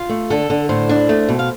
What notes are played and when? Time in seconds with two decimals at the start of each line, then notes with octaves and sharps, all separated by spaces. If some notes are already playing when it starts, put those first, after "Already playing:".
Already playing: F4
0.09 A3
0.30 D3 A4
0.50 D3
0.69 A2 C5
0.89 D4
1.09 A3
1.29 B2
1.39 F5